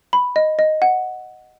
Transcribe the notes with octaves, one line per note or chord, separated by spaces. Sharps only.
B5
D#5
D#5
F#5